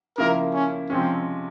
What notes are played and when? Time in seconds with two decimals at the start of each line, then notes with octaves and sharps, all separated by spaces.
0.18 C#3 F3 A#3 E4 A#4
0.54 C#4
0.90 C3 F3 G#3 C4 C#4